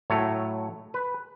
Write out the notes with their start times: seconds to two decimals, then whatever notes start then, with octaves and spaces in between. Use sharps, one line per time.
0.10 A2 F#3 A3 C#5
0.94 B4